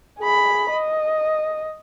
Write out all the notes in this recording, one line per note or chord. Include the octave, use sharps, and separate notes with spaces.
G#4 B5
D#5